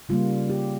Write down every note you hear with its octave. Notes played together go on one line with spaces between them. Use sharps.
C#3 G3 A#3 F4
G4